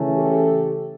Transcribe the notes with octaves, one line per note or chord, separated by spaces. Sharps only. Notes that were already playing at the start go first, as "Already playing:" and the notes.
Already playing: C#3 E3 A3 C#4
G4 A4